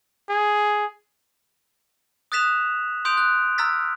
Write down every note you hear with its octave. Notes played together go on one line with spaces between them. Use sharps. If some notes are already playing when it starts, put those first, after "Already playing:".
G#4
D#6 F#6 A6 B6 E7 F7
C6 D#6 G6 D7 F7
F#6
A#5 E6 F6 A6 B6